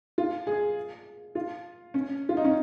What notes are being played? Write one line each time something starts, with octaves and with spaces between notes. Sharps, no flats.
F4
G#4
F4
C#4
F4
D#4
C#4